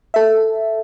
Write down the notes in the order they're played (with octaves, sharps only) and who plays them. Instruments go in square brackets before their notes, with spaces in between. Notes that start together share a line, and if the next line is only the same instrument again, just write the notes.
[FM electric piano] A4 E5